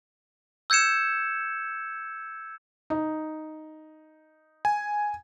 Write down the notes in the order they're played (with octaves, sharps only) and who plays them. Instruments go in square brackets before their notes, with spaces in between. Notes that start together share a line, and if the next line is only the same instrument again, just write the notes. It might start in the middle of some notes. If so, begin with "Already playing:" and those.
[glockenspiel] E6 G6 G#6 C#7 E7
[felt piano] D#4
[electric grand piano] G#5